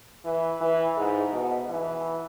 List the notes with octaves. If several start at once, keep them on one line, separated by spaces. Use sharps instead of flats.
E3
E3
G#2
B2
E3